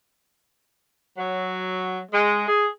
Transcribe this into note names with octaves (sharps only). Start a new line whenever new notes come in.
F#3
G#3
G#4